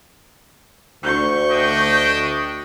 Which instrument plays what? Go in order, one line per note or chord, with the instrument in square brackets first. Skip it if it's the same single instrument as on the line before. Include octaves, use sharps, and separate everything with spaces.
[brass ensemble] D2 [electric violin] C#6 G6
[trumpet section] D4 D#5 G5